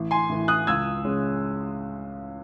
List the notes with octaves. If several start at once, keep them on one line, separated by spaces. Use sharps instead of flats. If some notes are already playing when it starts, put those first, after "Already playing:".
Already playing: A1
G#5 C6
A2 E3
D#6 F#6
C#2 E6 G#6
C#3 G#3 C#4